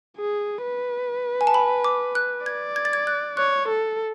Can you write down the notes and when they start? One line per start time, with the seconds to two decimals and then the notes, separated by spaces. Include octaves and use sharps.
0.17 G#4
0.63 B4
1.41 G#5
1.47 A5
1.54 B5
1.84 D6
2.15 F#6
2.46 D5 G#6
2.76 G#6
2.85 A6
2.93 G#6
3.07 F#6
3.37 C#5 F#6
3.68 A4